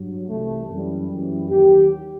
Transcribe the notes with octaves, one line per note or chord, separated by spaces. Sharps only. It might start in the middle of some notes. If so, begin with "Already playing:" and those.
Already playing: G2 F#3
C2 C3 E3 G3 A3
F#2 E3 G3
F#2 E3 G3
D#2 D#3 F#3 G4